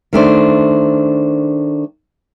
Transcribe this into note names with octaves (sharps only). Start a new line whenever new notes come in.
D#3 A3 D4 C5